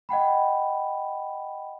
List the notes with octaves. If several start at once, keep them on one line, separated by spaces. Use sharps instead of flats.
D#5 F#5 G5 B5